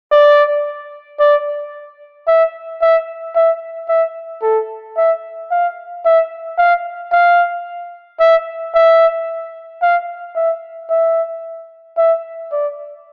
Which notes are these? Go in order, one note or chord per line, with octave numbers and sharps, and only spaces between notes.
D5
D5
E5
E5
E5
E5
A4
E5
F5
E5
F5
F5
E5
E5
F5
E5
E5
E5
D5